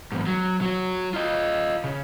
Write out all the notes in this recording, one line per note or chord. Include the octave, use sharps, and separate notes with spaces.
E2 G#2
F#3
F#3 F#4
F4 D#5
C#3